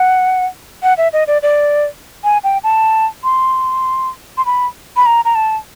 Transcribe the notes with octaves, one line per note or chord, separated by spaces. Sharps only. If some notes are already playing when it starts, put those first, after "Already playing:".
Already playing: F#5
F#5
E5
D#5
D5
D5
G#5
G5
A5
C6
C6
B5
B5
A#5
A#5
A5